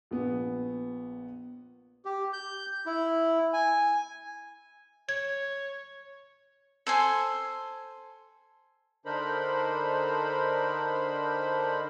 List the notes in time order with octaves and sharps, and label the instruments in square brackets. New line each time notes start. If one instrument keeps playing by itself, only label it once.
[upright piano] A#1 B3
[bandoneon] G4
G6
E4
G#5
[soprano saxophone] C#5 [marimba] G#6
[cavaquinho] A4 C5 G#5
[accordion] D3 D4 D#4 A#4 C5 B5